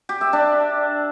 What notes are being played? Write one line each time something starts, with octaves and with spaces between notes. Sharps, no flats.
G4
E5
D4